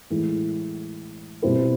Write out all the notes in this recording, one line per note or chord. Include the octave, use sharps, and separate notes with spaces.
A2 E3 G#3
B2 G3 C4 E4